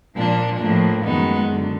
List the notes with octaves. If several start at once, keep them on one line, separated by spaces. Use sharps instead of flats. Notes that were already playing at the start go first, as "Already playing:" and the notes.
A#2 F3 A#3 D4
A2 F3 A#3 D4
F#2 D#3 G#3 B3 D#4
F#2 D3